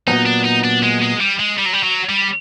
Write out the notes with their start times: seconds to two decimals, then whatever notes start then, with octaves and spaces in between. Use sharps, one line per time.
0.07 A#2 F#3 B3 D#4
0.26 D4
0.45 D#4
0.64 D4
0.83 G#3
1.02 G#3
1.21 G3
1.39 G#3
1.58 G3
1.66 F#3
1.73 G3
1.83 F#3
2.09 G3